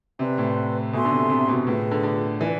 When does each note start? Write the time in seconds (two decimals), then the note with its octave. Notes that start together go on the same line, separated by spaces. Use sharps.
0.19 C3 B4 D5 G#5 C6
0.38 A2
0.93 B2 A4 E5 G#5 C6
1.05 D3
1.12 C3
1.30 C3
1.48 B2
1.67 A2 F4 G#4 B4
1.91 D3
2.03 D3
2.40 E3 F4 B4 D5 G#5